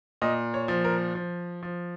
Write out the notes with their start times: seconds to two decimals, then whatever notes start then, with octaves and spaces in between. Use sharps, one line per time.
0.22 A#2 D#5
0.54 C#5
0.68 F3
0.84 A#4
1.15 F3
1.63 F3